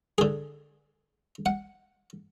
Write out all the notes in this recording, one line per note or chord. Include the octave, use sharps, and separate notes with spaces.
D3 G#4
F#5